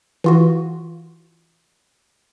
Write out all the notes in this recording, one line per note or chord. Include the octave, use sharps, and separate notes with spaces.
E3 F4 F#4